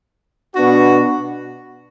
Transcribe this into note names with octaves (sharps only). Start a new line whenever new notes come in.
B2 B3 D4 F#4